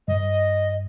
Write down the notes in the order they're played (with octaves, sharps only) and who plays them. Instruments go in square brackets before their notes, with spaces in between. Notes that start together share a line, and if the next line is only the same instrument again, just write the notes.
[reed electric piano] G2 [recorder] D#5